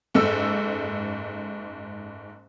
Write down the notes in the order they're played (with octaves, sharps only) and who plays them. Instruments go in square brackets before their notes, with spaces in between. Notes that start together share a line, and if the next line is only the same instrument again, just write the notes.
[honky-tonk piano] F#1 G#2 A4 E6